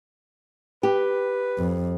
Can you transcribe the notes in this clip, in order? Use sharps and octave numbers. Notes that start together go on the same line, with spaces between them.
G4 B4
F2